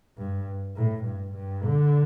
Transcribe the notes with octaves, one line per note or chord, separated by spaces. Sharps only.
G2
A2
G2
G2
D3